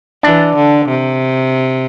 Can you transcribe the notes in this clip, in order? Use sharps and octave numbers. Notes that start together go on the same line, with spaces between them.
E3 D4
D3
C3